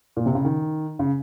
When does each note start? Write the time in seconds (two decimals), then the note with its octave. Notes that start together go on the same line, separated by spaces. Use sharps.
0.16 A#2
0.26 C3
0.35 C#3
0.45 D#3
0.99 C#3